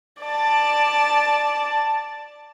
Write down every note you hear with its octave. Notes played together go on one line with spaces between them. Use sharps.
D5 A5